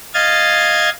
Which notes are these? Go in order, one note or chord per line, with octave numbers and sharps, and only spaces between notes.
D#5 F5 G#6 A6